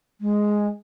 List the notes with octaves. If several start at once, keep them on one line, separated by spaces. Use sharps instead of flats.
G#3